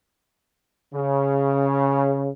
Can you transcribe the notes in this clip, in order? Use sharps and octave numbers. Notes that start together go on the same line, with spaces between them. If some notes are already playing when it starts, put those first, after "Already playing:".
C#3